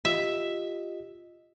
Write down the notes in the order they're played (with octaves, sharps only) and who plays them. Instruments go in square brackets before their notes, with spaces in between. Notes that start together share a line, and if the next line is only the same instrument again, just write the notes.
[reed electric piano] F4 G4 D#5 [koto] E5